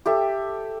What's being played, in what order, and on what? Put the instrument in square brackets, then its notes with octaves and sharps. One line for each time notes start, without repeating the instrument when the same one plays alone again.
[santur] G4 A4 E5